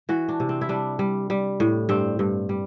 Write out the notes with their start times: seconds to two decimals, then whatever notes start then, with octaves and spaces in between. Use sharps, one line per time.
0.09 E3 F#4
0.29 D4
0.40 C3
0.49 C4
0.61 E4
0.69 G3 D4
0.99 G3
1.30 G3
1.60 A2
1.89 G2 C4
2.19 G2
2.49 G3